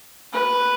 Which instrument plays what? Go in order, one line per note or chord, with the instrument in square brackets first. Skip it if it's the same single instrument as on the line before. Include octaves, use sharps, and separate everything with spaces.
[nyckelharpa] B4